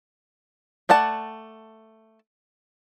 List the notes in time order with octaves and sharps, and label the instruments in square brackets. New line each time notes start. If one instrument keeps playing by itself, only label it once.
[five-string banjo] A3 D5 F#5 A5